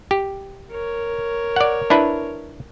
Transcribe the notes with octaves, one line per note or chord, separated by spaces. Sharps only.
G4
A#4 C#5
D5 F#5
D4 E4 B4